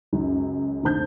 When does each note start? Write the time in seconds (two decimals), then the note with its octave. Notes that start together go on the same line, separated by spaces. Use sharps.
0.13 C#2 F#2 F#3
0.83 F1 D3 C5 A5 G6